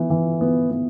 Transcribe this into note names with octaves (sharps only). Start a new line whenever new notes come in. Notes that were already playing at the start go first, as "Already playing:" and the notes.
Already playing: E3 B3
E3
B3
B3